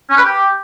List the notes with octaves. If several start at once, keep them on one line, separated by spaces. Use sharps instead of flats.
C#4
B4
G4